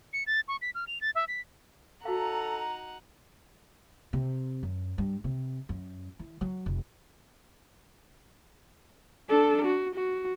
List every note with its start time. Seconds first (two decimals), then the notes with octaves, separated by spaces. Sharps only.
0.13 C#7
0.27 A6
0.48 C#6
0.62 B6
0.75 F6
0.87 F7
1.01 A6
1.15 E5
1.28 B6
2.05 D#4 F#4 A4 F5 F#5 A#5
4.13 C3
4.63 F#2
4.98 G2
5.24 C3
5.69 F#2
6.19 E3
6.41 F#3
6.66 F1
9.29 D4 A4
9.65 F#4
9.95 F#4